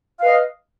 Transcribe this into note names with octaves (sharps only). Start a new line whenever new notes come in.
B4 D#5 F5